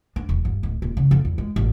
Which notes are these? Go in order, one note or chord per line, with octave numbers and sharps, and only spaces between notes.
D4
E1
G2
D1
D#1
C#3
F2
E2
G#3
A1